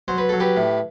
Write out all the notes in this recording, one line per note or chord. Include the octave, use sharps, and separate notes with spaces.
F#3 C5
B4
F#3 A4
G4 B4
A2